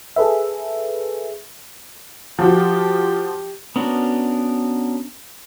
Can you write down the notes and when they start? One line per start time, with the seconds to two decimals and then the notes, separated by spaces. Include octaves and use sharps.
0.16 G#4 A4 B4 E5
2.39 F3 F#4 G4
3.76 B3 C#4 D4 F#4 A#4